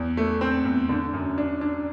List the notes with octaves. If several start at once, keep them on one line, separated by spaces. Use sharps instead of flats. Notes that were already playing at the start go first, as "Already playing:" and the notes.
Already playing: E2
A3
C4
E2
D3
F#2
D4
D4